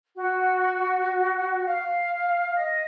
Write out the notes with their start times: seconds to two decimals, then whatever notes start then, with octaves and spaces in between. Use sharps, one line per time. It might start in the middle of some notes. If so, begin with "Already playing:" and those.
0.16 F#4
1.65 F5
2.55 D#5